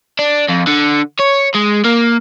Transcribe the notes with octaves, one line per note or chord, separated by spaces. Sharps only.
D4
F2
D3
C#5
G#3
A#3